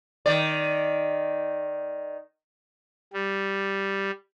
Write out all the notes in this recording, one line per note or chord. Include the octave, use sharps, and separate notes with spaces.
D#3 D5
G3